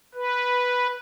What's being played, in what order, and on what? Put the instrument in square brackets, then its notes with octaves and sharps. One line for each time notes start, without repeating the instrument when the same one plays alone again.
[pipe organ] B4